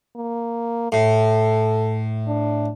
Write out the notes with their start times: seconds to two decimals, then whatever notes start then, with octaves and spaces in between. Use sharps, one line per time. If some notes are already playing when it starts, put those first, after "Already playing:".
0.16 A#3
0.92 A2 A4
2.27 D4